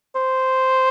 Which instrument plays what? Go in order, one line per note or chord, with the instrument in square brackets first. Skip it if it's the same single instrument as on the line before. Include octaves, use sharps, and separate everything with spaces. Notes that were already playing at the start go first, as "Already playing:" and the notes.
[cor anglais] C5